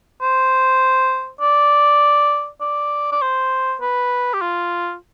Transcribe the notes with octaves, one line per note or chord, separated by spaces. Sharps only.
C5
D5
D5
D5
C5
B4
G4
F4